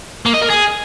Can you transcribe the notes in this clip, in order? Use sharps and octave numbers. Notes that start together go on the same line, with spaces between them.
A#3
D#5
A#4
G#4